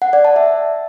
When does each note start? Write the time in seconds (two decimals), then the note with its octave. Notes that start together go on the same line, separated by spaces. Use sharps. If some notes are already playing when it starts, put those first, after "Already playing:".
0.02 F#5
0.13 D5
0.25 A5
0.36 E5